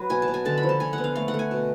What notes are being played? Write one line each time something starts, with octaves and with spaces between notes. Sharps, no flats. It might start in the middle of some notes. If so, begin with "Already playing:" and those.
Already playing: F#3 B4
B2 G#5
A5
B2
G#5
D3 A5
B5
F3
A5
D3 G#5
F#5
B3
F5
A3 F5
F#5
A3
G#5
B2